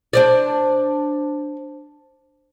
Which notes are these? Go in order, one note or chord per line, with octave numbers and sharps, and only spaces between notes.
D4 C5 D5